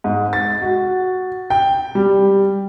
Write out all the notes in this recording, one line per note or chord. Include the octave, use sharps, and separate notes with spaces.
G#2
A6
F#4
G5
G3